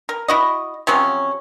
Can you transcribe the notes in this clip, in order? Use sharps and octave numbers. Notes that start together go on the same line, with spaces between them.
A#4
E4 F#4 D#5
C3 F3 F#3 C#4